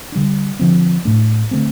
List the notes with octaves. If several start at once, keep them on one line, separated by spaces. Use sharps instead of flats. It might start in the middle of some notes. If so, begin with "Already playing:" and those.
D3 G3 D4
D3 F3 C4
A2 A3 D4
D3 A3 C4